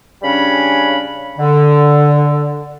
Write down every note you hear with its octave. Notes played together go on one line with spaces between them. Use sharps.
C#3 G3 C#4 D4 C#5 B5
D3